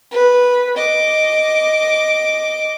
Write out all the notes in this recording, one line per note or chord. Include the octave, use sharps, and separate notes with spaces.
B4
D#5 D6